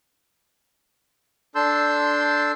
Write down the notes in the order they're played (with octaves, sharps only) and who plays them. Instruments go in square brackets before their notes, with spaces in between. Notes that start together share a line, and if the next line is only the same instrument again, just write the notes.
[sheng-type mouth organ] D4 A4 A5 C6 E6 G6